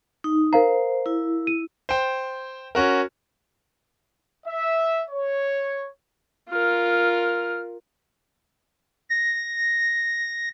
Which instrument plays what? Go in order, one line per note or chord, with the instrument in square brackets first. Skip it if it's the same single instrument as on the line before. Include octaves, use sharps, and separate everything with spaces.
[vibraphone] D#4
[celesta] A#4 F5 A#5 [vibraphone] C5
[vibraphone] E4
[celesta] D#7
[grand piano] C5 G5
C#4 F#4 A#4
[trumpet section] E5
C#5
[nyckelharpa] F4 A#4 [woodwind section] F6
[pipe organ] A#6